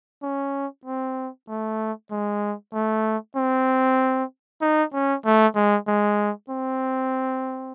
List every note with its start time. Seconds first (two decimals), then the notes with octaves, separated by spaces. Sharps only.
0.23 C#4
0.85 C4
1.48 A3
2.11 G#3
2.73 A3
3.36 C4
4.61 D#4
4.93 C#4
5.25 A3
5.55 G#3
5.88 G#3
6.50 C4